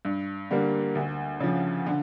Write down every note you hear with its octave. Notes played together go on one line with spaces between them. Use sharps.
G2
D3 G3 A#3
D2
C#3 F3
D3